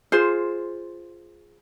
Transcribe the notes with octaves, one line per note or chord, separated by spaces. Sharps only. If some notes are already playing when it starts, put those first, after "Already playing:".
F4 G#4 C5